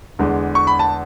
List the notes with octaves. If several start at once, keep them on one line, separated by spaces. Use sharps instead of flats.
E2 D3 G#3
C#6
B5
A5